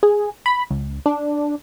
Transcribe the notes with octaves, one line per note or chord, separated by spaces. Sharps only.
G#4
B5
C#2
D4